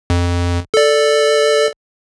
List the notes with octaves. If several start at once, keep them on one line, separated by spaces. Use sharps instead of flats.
F2
A4 D5